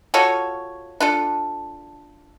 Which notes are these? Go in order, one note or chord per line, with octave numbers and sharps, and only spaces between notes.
F4 F#4 A4 C#5
D4 F4 A4